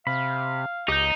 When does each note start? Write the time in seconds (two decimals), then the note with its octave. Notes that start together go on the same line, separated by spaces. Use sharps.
0.07 C3 F5 B5
0.88 C#2 D#4 G4 G6